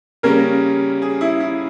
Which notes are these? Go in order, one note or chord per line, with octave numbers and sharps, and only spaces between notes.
C#3 G3 A#3 C#4 A#4
G#4
E4
E4